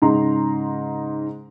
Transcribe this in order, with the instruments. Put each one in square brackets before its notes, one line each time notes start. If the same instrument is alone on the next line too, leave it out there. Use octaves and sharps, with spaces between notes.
[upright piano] G#2 C#3 A#5 C6